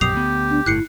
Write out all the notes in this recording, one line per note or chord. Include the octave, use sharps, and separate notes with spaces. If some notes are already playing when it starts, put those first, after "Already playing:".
A#1 F#2 B2 G4 D#6 C7 F7
D2 B3
D4
G1 A2 E4 F#6 C7 C#7